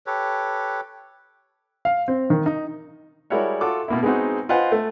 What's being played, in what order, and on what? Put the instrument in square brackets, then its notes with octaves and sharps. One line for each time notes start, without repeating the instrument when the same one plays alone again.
[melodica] G4 A4 B4 C#5
[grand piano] F5
C4
D#3
D#4
[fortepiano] G3 G#3 E4 F#4 A#4 C#5
F4 F#4 A4 D6
B2 A#3 E4
G#3 B3 C4 D#4 F#4
F4 B4 C5 D#5 F#5 G#5
A3